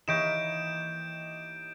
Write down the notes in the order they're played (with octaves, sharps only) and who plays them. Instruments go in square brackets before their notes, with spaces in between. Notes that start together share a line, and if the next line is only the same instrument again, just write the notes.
[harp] E3 A#3 [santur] D#4 G4 C#5 [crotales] G6 D7 E7